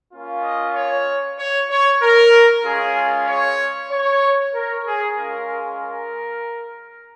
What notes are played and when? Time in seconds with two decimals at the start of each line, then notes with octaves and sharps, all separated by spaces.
0.13 A#3 C#4 F4
0.43 D#5
0.75 C#5
1.38 C#5
1.69 C#5
2.02 A#4
2.64 G#3 C#4 F4 G#4
3.27 C#5
3.90 C#5
4.53 A#4
4.85 G#4
5.17 G#3 C#4 F4 A#4
5.79 A#4